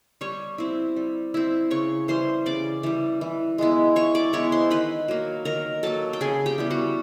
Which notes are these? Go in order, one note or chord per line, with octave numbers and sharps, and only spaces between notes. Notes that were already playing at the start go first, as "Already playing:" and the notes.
G3 C#5 C#6
C4 E4
G3
C4 E4
C#3 C#5 C#6
E3 G3 C5 C6
C#3 D5 D6
E3 G3
E3
G#3 B3 E4
E3 C#5 C#6
D5 D6
G#3 B3 E4 C#5 C#6
C5 C6
D#3 B4 B5
F#3 A#3
D#3 A#4 A#5
F#3 A#3 A4 A5
G5
C#3 G#4 G#5
G4 G5
E3 G3 B3
F#4 F#5